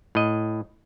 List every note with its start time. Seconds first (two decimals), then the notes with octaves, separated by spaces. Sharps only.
0.15 A2 D#5